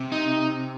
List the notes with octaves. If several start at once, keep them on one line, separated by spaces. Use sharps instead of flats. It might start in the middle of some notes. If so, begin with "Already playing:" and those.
Already playing: C3
D#4